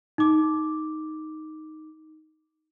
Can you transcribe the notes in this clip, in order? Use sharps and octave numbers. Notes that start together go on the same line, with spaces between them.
D#4 D6